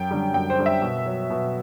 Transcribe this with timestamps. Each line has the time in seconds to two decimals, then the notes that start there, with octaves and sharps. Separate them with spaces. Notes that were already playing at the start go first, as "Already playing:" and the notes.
Already playing: F#2 G5
0.11 D3 G3
0.34 F#2 G5
0.50 C5
0.58 D3 G3
0.66 E5
0.82 B2
1.06 F#3
1.30 B2